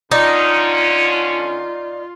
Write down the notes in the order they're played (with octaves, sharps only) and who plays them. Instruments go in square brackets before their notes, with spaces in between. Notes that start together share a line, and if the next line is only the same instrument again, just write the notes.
[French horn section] D3 C#4 [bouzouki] D#4 [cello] F4 [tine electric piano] D5